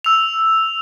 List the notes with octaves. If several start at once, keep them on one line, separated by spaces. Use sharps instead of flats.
E6 F7